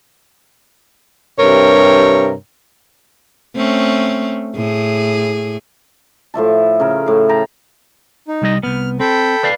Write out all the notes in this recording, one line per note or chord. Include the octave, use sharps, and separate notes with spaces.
G2 C3 A#4 C#5
A3 C4 C#4
A2 G#4
A2 F3 E5 A5
C#3 A#4
A2 F5
G5 A5 A#5
D#4
C2 G3 D#5
C2 B3 F6
C4 A4 G5 B5
B4 D5 F5